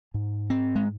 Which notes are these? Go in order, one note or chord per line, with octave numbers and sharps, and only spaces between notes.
G#2
C4
G#3